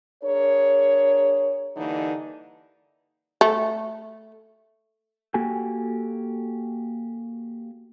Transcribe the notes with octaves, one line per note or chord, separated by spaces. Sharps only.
D4 G#4 A#4 C#5
G2 D3 E3 A#3 D#4
A3
A#3 F#4 G4 A4 G#5